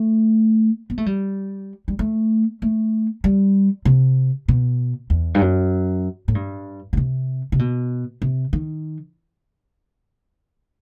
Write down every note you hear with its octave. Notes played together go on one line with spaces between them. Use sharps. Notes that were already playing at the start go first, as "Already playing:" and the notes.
Already playing: A3
B3
A3
G3
G3
A3
A3
G3
C3
B2
E2
G2
F#2
A2
G2
B2
C3
C3
B2
C3
D#3